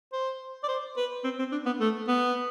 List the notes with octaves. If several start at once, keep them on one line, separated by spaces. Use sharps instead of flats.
C5
D5
C5
B4
C4
C4
D4
B3
A3
B3